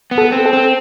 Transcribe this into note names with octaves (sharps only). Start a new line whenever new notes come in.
B3
A4
C4
A4
C4